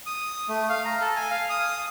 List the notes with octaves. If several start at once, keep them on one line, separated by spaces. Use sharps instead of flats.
D#6
A3
F5
A#5
A4
G#5
F5
D#6